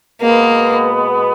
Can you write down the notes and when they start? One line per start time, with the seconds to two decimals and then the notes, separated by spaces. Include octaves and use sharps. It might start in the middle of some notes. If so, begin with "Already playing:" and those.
0.21 B2 G#3 A#3 B3